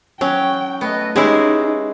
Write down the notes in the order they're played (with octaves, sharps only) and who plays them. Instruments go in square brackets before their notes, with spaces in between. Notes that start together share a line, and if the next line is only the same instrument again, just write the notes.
[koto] F#3 [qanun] C#4 [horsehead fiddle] G5
[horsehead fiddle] A3 D#5 [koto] B3
[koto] G#3 E4 [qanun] C#4 G4 G#4 [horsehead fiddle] D#4